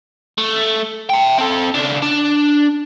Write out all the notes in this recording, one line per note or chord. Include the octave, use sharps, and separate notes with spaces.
A3
E5 G5
C4 A4
C#3 D4
D4